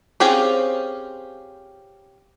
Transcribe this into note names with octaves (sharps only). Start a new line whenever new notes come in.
C4 C#4 F4 G4 G#4